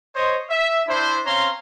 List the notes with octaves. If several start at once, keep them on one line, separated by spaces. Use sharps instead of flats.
C5 C#5 D#5
E5
D4 E4 C5
C4 C#4 C#5 F5 A#5 C6